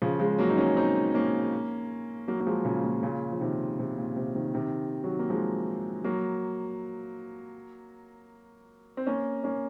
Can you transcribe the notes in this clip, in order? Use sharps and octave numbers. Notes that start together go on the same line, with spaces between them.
C#3 F3
F3 G#3
F#3 A#3
D#4
A#3 C#4
C4 D#4
A#3 C#4
F#3 A#3
A#3
F3 G#3
A#2 C#3
A#2
A#2 C#3
F3
C3 D#3
C3
A#2
C3
C3 D#3
C3 D#3
D#3 F#3
A#3
F3 G#3
F#3 A#3
C4
A#3 C#4
A#3 C#4